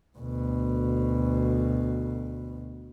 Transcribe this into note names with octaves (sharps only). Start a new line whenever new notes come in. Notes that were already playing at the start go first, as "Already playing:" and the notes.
D2 B2